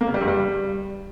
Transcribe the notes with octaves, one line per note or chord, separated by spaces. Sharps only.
A#3
C#3
G3
G2
G3